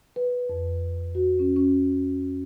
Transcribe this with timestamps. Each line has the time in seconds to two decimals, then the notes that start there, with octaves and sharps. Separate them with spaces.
0.16 B4
0.49 F2
1.15 F#4
1.39 C#4
1.56 C#4